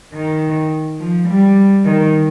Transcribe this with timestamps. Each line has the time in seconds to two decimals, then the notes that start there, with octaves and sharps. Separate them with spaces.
0.13 D#3
0.99 F3
1.28 G3
1.85 D#3